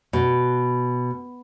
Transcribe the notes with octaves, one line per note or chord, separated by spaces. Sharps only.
B2